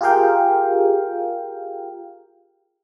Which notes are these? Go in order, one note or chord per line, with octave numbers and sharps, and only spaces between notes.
F4 G4 G#4 A#4 F5 G5